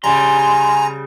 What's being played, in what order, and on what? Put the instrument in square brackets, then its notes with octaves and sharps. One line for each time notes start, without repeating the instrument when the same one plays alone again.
[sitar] C#3 G3 [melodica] G#5 [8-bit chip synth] A#5 [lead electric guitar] C6